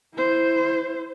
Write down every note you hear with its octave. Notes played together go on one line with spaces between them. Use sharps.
E4 C5